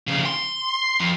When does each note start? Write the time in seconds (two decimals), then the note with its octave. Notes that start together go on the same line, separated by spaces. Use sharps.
0.07 F2 C#3
0.26 C6
1.00 F2